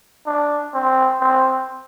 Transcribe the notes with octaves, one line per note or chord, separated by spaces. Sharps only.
D4
C4
C4